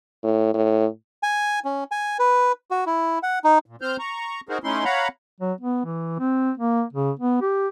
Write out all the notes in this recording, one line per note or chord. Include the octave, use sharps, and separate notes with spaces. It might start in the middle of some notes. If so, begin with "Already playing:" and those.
A2
A2
G#5
C#4
G#5
B4
F#4
E4
F#5
D#4
A#2
C4 C5 F6 G6
A#5 C#6
D#4 F#4 G#4 A#4 C5
A3 C#4 D#4 E4 C6
C#5 F5 F#5 A#5 B5
F#3
B3
E3
C4
A#3
C#3
B3
G4